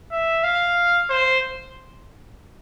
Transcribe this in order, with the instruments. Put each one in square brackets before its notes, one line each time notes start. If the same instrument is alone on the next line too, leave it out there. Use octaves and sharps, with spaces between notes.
[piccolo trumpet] E5
F5
C5